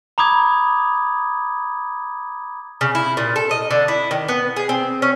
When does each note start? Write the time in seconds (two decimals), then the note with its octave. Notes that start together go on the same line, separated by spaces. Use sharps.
0.18 A#5 B5 D6 D#6 G#6
2.81 C#3
2.95 E4
3.17 A#2
3.36 A4
3.51 D#5
3.71 D3
3.88 E4
4.11 D#3
4.29 B3
4.56 G#4
4.69 C4
5.02 C#4